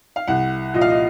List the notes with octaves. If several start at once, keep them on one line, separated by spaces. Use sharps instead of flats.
F5
C2 F#5
A#2 F3 D#5
F5
D#5